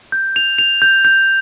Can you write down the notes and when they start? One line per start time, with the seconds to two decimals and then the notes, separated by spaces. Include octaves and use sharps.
0.12 G6
0.36 F7
0.58 F7
0.82 G6
1.05 G6